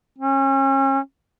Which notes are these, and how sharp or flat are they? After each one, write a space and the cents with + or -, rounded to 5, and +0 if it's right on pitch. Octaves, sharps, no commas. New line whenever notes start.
C#4 -35